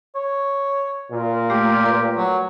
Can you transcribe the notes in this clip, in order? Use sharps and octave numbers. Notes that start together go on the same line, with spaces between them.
C#5
A#2
A3 G4
A#4 B4
F#3